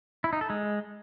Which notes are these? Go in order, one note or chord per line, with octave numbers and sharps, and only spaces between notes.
E4
D#4
A4
G#3